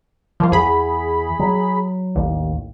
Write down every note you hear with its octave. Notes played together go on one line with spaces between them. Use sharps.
F3 A#3 F4
E2 G#4 B5
F#3
A1 D#2